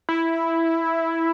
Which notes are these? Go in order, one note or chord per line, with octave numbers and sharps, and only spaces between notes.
E4